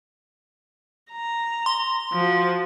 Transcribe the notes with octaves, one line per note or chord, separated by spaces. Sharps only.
A#5
C6
F3 F#4